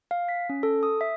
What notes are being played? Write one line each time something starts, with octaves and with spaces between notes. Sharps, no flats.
F5
B6
C#4
A4
D#6
E5